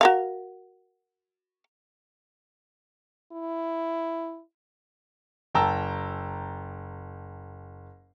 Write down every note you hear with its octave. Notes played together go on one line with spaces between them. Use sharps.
F#4 A#4 F5
E4
F#1 G5 A5 A#5 E6